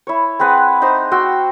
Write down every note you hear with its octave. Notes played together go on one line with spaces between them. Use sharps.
E4 C#5
C4 G#4 B4 F#5
D#4 C5 A#5 C6
F#4 G5 C6 E6